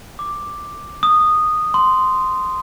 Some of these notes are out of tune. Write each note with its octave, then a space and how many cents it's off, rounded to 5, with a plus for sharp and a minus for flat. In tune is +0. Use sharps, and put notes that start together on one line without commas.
D6 +5
D#6 -10
C6 -10